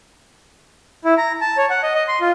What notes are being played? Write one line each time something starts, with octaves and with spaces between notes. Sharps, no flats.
E4
A#5
A5
C#5
F#5
D#5
D#5
C6
F4